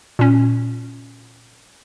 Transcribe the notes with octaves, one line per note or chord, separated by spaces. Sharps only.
A#2 C#4